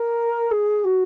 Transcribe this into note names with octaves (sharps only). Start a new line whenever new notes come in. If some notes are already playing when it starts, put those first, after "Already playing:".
Already playing: A#4
G#4
F#4